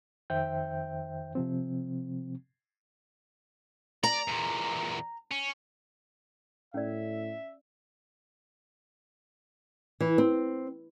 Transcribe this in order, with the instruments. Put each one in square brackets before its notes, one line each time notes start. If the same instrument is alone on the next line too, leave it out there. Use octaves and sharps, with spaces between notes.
[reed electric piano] F2 D#3 C5 E5 G5 G6
C3 F3 C4
[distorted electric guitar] D5 [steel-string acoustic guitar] A#5
[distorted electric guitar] E2 A#2
C#4
[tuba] A2 [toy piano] C#4 D5 [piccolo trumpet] E5
[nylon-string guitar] E3
C4